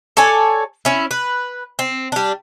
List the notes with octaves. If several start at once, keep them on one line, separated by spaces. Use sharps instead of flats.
A4 C#5 D5 G#5
C#4 E4
B4
C4
G3 D4